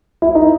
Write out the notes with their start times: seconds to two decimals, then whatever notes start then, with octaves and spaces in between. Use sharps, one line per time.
0.22 E4
0.35 D#4